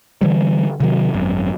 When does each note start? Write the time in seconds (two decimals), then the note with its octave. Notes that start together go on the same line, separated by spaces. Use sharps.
0.21 D3 E3 G3
0.80 C3 D#3 F#3
1.14 G#1 F#2